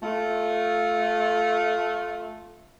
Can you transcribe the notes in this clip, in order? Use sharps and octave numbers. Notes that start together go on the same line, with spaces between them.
A3 F4